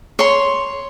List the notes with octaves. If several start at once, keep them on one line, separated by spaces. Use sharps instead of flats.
C#5 C6